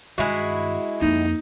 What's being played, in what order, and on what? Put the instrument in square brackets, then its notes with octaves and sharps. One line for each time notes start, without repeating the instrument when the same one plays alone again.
[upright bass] G2 D#3 [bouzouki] G#3 E4 F#4
[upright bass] F2 A#3 [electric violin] D#4